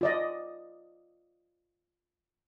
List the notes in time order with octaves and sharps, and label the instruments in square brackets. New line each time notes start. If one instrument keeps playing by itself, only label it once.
[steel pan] F4 D5 D#5